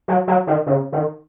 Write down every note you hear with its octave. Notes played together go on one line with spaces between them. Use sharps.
F#3
F#3
D#3
C#3
D#3